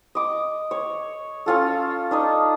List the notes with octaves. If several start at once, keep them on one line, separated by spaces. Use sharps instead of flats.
D#5 D6
C#5
C#4 F4 A4
D4 D#4 D#5